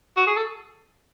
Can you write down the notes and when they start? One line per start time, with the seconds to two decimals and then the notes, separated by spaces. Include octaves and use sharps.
0.17 F#4
0.27 G#4
0.37 A4